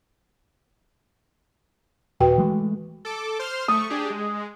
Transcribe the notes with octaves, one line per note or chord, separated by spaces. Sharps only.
D#1 F#4 B4 G5
E3 G#3 A3
A4 D6
C5 C6 F6
A3 C#6 D#6
D4 G4 G#4
G#3